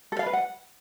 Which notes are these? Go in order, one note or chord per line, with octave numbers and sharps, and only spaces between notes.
A4
F5
B4
F#5